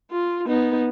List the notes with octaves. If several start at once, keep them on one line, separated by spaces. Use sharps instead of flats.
F4
B3 D#4